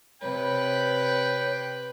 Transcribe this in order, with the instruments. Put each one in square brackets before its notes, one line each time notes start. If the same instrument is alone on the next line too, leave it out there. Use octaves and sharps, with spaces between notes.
[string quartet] C3 [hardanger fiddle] B4 [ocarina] C#5 [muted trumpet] G5